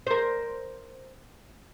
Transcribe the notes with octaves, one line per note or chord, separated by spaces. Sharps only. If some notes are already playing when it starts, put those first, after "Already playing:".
A#4 C5